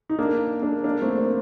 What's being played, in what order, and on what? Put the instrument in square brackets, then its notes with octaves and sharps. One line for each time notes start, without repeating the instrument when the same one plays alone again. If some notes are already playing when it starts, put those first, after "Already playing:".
[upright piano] D#4
A#3 D4
A#3 D4
A#3 D4
A3 C4
A#3
C4